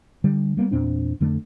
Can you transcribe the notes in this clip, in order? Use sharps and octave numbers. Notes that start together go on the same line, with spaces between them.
D3 G3
G3 A#3 B3
E2 A#2 C4 D4
F2 D3 A3